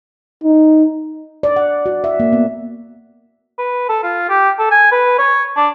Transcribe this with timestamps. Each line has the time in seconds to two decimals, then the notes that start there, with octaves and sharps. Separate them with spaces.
0.44 D#4
1.43 D5
1.56 F#5
1.86 F#4
2.04 E5
2.20 A#3
2.33 B3
3.58 B4
3.89 A4
4.03 F4
4.29 G4
4.59 A4
4.71 G#5
4.92 B4
5.18 C#5
5.56 D4